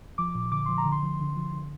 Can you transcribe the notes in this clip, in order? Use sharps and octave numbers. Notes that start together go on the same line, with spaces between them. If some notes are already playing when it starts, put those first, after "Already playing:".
F3 D6
A#2
D3 D6
F3 C6
A#5
D3
C6
F3
D3
F3
D3